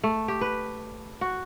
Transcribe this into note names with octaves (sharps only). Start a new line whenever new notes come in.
A3
G4
B4
F#4